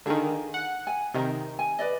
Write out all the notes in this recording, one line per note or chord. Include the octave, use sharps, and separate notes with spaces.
D3 D#3 F4 G#4 A#4
F#5
G#5
C3 D#3 D#4 A#4
G#5
B4 D5 D#5